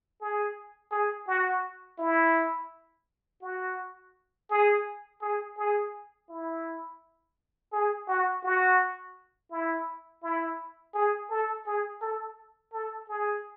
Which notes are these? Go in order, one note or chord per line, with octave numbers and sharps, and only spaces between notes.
G#4
G#4
F#4
E4
F#4
G#4
G#4
G#4
E4
G#4
F#4
F#4
E4
E4
G#4
A4
G#4
A4
A4
G#4